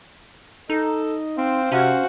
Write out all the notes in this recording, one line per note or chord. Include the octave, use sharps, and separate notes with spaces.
D#4 A4 D#5
C4 C5 F5
C3 C#4 F#4